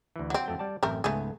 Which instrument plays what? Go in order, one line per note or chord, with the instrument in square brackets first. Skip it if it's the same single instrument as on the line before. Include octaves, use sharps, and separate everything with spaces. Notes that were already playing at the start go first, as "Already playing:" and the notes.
[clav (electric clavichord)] D2 E3
[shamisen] F#3 C4
[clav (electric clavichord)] F2 A3 G5
G3 D5 A5
[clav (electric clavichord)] A1 F#2 [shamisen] A3 C4 A#4
[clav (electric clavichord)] C#2 G#2 B3 [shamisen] A3 G#4